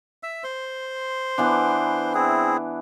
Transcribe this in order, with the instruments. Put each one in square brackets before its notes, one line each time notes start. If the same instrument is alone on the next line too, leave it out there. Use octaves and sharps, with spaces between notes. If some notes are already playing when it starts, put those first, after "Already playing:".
[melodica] E5 E6
C5 C6
[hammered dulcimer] E3 B3 D4
[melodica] C4 E4 G#4